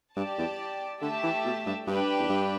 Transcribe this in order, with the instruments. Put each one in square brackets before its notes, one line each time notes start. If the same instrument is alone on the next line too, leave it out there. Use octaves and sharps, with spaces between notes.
[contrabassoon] G2 [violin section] G4 D5 A5
[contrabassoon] E2
[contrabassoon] D3 [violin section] A3 G4 E5 A5
[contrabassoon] E3
B2
G2
[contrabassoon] G2 [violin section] D4 G4 B4 G5
[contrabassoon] E2
G2